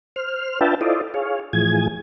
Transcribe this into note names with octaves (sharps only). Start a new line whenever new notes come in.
C5 F6
D4 F4 B4 E5 G5 A5
E4 F4 A4 C5 D5 D#5
G#4 C#5 F5
A2 E3 F3 G#4 G#5 G#6